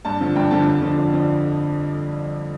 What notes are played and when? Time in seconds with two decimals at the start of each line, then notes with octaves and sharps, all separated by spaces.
0.05 G2 A5
0.21 D3 F3
0.36 G2 G5
0.51 D3 F3 A5
0.66 F2
0.82 D3 F3
0.98 F2
1.13 D3 F3